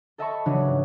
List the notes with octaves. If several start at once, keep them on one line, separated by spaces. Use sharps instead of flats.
A4 D#5 E5 A5 B5 C#6
C#3 E3 F#3 C#4 D4
A#1 G#2